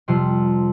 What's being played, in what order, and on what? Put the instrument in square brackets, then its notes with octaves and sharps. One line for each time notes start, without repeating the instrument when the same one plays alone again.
[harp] F2 C3 G3 C6